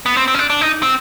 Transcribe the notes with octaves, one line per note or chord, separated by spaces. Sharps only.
B3
C4
C4
C#4
D4
D4
D#4
C4